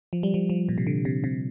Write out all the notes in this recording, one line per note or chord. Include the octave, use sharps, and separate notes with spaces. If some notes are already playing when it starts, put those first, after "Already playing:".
F3
G3
F3
F3
A#2
C3
D3
C3
C3